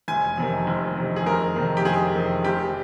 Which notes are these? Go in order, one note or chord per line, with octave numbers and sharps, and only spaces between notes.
F1 G#5
F2 C3 D#3
F1
F2 C3 D#3
G#4
F1 A#4
F2 C3 D#3
G4
F1 G#4
F2 C3 D#3
F1 G4